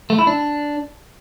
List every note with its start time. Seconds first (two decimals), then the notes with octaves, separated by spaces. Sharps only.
0.10 A3
0.19 E4
0.27 D4